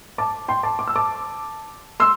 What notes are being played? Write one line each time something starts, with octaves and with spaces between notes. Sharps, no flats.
A5 D6
G5 C6
A5 D6
D6
E6
A5 D6
C6 E6